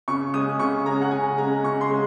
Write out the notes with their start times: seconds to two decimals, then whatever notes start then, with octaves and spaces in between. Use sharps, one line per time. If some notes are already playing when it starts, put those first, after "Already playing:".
0.08 C#3 C#6
0.34 G#3 C#4 D#6
0.59 C#3 C#6
0.86 G#3 C#4 A#5
1.01 F#5
1.11 C#3 G#5
1.37 G#3 C#4 A#5
1.64 C#3 C#6
1.81 C6
1.90 G#3 C#4